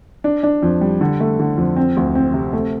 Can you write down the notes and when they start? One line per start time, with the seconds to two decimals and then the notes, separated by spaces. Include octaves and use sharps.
0.24 D4
0.43 D4
0.63 F2
0.81 G3
1.01 D3
1.20 A3
1.39 D3
1.57 F2
1.76 C4
1.97 D2
2.15 C4
2.34 C3
2.53 A3